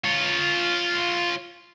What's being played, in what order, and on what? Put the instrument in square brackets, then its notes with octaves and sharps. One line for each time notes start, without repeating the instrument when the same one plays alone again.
[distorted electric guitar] F4 C#5